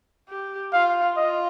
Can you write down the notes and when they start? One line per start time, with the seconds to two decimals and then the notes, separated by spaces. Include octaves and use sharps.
0.29 G4
0.73 F4 F5
1.17 F4 D#5